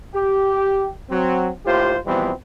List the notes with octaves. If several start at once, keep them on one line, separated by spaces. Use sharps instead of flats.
G4
F#3 C4
D#2 A2 F4 G4 C5
B2 E3 F3 G3 B3 C4